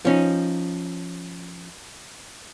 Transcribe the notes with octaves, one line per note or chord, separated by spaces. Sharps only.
F3 C#4 D#4